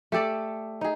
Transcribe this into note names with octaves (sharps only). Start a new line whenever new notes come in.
A3 G4 A4 D5
D#4 G#4